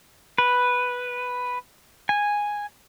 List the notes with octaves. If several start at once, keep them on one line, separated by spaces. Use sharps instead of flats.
B4
G#5